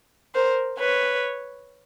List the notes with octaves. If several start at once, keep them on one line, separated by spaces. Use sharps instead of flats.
A#4 C5
B4 C#5